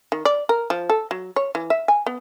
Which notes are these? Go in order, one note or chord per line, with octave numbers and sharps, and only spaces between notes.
D#3
D5
A#4
F3
A4
F#3
C#5
E3
E5
G#5
B3